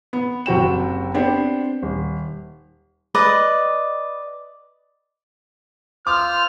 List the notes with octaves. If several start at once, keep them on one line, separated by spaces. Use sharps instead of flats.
B3
F#1 C3 F#4 G5 E7
B3 C4 D4 G4 C5
D#1
B4 D5 D#5
F4 C5 D6 E6 F6